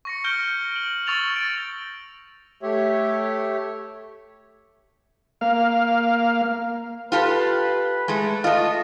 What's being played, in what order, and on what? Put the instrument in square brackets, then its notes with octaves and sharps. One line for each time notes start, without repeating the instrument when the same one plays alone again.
[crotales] C#6 A#6 C#7
F6 G6 D7 G7
D7 F#7
C#6 E6 A6 F7 F#7
A6 D7
[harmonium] A3 G4 C#5 E5
[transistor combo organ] A#3 F5
[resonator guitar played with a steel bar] F4 G4 A4 [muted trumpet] B4
[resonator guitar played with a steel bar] G#3 A3
[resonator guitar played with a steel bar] A3 F4 [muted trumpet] D#5